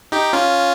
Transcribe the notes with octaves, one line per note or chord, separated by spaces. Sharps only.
D#4 G4
C#4 F4